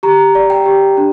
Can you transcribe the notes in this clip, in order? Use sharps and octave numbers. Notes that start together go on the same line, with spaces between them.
G4 A#5
D5
G5
G4
D4